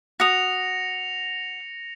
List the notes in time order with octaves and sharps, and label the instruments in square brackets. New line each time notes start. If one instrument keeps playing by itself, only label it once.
[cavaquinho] F#4 D#6 [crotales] A#6 C#7 F7